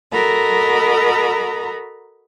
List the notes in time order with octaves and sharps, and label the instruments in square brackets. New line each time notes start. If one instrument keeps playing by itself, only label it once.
[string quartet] F#4 A4 A#4 D#5 A#5 B5